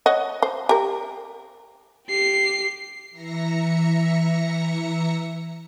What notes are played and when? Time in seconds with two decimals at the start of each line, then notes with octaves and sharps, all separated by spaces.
0.06 C#5 D#5 F#5
0.43 C5
0.69 G4 A#4
2.08 G4 C7
3.11 E3 E5 A#5 A#6 C#7